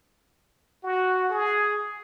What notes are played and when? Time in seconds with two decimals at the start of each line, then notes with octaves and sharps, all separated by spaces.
0.84 F#4
1.30 G#4